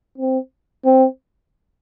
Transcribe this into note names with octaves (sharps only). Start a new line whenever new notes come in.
C4
C4